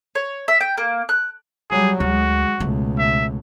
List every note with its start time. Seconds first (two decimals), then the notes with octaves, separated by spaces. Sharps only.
0.15 C#5
0.48 E5
0.61 G5
0.78 A#3
1.09 F#6
1.71 F#3 G3 G#4
2.00 D2 G#3 F#4
2.60 C#2 B2 A3
2.99 E5